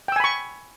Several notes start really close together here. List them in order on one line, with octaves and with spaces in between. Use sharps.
G5 E6 G#5 B5 C#6